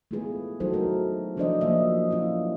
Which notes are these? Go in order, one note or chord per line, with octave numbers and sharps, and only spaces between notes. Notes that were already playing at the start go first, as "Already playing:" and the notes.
A3 B3 E4 F4 G#4 B4
F#3 D#4 E4 F#4 A4 C5
A3 A#4
F3 D4 E4 C5 D5 D#5
F3 F#3 A#3 F4 D#5 E5
C#4 E4 F4